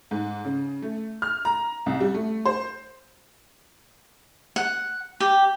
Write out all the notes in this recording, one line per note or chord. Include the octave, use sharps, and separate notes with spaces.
G#2
C#3
A3
F6
A#5
C2
G3
A3
C5
F#5
G4